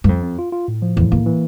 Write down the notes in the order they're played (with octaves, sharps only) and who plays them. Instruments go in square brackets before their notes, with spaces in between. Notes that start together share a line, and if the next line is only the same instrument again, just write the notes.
[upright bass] G2
[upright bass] F2 [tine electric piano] C4
[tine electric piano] C4
F4
F4
A2
F3
[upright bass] E2 [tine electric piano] A2
[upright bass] E2 [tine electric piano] A#3
[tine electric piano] E3